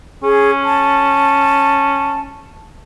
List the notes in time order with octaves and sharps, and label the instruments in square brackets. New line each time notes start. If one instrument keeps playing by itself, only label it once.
[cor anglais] C#4 [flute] G#4
[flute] A5